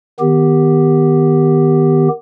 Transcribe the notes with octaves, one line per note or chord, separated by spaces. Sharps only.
D#3 B3 G4